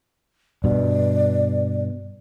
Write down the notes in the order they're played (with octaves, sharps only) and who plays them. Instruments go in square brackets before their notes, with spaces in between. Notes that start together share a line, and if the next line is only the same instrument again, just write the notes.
[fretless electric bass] G2 B2 [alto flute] D5